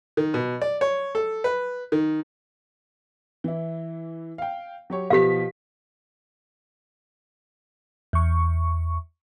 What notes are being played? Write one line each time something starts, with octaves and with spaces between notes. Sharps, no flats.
D#3
B2
D5
C#5
A4
B4
D#3
E3 E4
F5 G5
F#3 G4 C#5
B2 F3 G4 F5 B6
E2 C#6